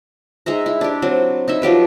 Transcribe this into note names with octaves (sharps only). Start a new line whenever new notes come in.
G#3 D#4 E5 A#5
E4
D4 G4
F#3 C4
D#4 E4 E5
F3 F#3 G4 B4